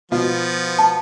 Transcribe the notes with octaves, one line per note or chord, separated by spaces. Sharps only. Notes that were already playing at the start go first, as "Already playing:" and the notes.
B2 F3 B3 F4
A5